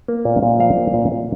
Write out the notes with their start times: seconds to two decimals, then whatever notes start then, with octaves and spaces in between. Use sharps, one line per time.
0.08 A#3
0.25 A#2
0.43 A#2
0.60 F3 F5
0.78 A#3
0.94 A#2
1.12 A#2